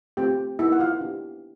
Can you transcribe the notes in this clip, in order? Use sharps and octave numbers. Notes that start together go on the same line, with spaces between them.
A3 C4 F4 G4 G5
A#3 D#4 E4 F#4 E5
F#5
F4 F5
B3 D4 G4